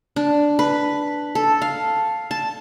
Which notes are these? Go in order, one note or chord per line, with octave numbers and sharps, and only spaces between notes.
D4
B4
A4
F5
A5